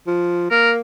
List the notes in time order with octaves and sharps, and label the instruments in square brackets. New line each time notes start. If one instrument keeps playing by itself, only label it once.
[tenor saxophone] F3
[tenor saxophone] A#3 [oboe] A#4